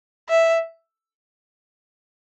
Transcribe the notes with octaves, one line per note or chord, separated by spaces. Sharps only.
E5